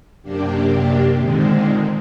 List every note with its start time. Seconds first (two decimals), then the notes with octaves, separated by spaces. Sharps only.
0.23 F#2 C3 A#3 D4 G4
1.18 A#2 D3 D#3 G#3 C4